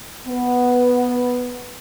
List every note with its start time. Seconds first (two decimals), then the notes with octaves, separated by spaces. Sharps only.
0.27 B3